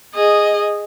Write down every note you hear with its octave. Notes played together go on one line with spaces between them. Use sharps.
G#4 D#5